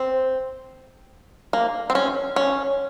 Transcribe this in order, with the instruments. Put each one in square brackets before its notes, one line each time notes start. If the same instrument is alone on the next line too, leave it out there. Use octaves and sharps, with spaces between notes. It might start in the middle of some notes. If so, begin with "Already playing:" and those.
Already playing: [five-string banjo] C4
A#3
C4
C#4
C#4